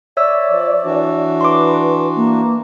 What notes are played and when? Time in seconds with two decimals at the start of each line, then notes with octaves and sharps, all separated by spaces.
0.17 C#5 D5 E5 E6
0.50 F3
0.85 E3 D4 F#4
1.41 B4 C6 D6
2.15 A#3